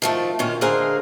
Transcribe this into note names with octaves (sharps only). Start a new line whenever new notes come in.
D#3 F3 A3
A#2 D#3 C#4 F4
D3 G#3 A#3 G#4 A#4 C5